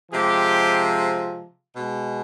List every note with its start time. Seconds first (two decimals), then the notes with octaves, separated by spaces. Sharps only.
0.12 C3 F3 G#3 G4
1.75 B2 G#3